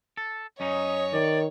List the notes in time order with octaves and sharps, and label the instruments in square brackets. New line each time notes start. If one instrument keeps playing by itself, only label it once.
[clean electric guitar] A4
[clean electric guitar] F#2 C#4 D#4 [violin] C#5 [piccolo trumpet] D#5
[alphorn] D#3 [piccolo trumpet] D5